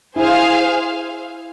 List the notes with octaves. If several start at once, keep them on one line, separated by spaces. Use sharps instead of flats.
E4 G#4 C5 F5